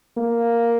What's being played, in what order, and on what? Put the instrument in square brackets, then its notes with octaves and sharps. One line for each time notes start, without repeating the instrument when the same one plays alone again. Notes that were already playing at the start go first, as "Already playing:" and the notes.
[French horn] A#3